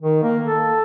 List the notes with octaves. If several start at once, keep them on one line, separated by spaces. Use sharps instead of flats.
D#3
A#3
A4